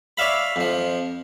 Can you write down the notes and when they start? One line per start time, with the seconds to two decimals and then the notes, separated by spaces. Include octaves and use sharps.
0.18 C#5 D5 E5 F5 B5
0.56 F2 F3